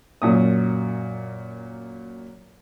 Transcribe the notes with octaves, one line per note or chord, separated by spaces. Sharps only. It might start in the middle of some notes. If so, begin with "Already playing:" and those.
F#2 A#2 D#6